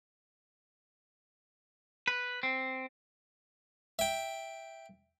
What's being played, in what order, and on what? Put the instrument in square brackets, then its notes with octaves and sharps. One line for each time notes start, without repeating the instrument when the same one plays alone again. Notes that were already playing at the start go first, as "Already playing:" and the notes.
[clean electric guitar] B4
C4
[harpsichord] E5 G5